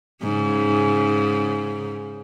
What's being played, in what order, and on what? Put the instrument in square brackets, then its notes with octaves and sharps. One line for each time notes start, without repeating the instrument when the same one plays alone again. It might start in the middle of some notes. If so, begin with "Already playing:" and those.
[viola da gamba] G#2 C#3